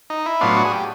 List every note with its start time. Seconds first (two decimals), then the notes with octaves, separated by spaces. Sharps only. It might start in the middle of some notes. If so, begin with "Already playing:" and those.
0.10 D#4
0.26 E4
0.41 A2 F#3 B3 D4 F4
0.57 F#4
0.64 G#4
0.73 G4